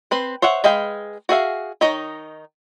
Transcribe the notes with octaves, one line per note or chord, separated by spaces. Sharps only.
C4 B4 C5
C5 C#5 E5 F#5
G#3 B4 D#5 F5 G5
F#4 G#4 E5 F5
D#3 D#4 C#5 D#5 A#5